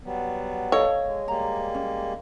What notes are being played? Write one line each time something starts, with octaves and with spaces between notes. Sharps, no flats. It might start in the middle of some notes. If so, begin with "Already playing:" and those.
F#3 G3 B3
A4 C#5 D#5 F5
G#3
G3 G#3 A#3 A#5
C#4